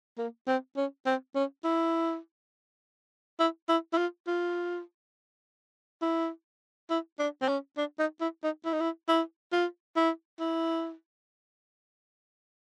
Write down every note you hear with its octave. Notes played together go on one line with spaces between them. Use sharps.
A#3
C4
C#4
C4
C#4
E4
E4
E4
E4
F4
F4
E4
E4
D4
C4
C#4
D4
D#4
E4
D#4
E4
D#4
E4
E4
F4
E4
E4